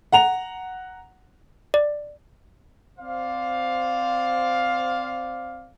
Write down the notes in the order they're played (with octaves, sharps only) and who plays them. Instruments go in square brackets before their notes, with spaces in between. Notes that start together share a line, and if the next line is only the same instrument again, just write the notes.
[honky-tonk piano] F#5 A#5 F7
[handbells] D5
[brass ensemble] C4 C5 D5 F5